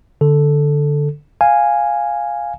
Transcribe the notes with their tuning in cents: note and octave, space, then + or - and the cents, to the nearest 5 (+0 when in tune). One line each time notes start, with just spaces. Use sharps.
D3 +0 A4 +0
F5 +0 G#5 -5